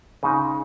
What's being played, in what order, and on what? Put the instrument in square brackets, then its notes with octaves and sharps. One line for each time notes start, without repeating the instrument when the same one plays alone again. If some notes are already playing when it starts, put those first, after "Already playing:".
[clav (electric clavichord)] C#3 G#3 D#4